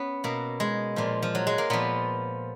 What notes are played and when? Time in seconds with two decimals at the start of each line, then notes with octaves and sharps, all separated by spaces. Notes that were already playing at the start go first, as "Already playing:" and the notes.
Already playing: B3 C#4
0.24 B2 A#3
0.60 G#3
0.96 A#2 F3
1.22 F3
1.35 F#3
1.47 G#3
1.58 A#3
1.70 A#2 F3 B3